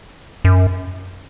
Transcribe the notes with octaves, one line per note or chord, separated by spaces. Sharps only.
F#2